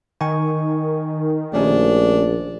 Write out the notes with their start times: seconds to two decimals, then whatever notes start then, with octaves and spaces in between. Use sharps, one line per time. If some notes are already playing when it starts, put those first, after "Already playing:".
0.21 D#3 G#5 C#6
1.53 A#1 A3 C#4 D4 G4